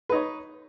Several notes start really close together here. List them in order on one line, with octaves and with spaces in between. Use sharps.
B4 D#4 C#5